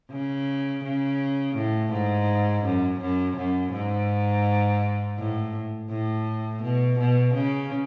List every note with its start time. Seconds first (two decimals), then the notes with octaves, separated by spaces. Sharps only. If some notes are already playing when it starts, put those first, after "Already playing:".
0.11 C#3
0.84 C#3
1.56 A2
1.92 G#2
2.64 F#2
3.01 F#2
3.37 F#2
3.73 G#2
5.18 A2
5.90 A2
6.62 B2
6.99 B2
7.34 C#3